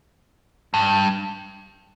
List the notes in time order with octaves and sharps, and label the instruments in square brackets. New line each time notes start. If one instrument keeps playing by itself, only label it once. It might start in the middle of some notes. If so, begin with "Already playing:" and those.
[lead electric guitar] G2